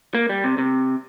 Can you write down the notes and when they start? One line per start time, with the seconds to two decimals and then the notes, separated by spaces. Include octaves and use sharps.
0.15 A#3
0.29 G3
0.44 C3
0.58 C3